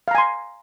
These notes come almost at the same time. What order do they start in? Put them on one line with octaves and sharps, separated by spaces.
F5 A#5 G#5 C6